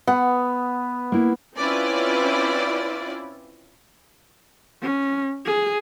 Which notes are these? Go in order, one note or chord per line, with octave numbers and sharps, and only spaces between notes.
B3 F#5
A#3 E4
C4 C#4 E4 F4 B4 D5
C#4
G#4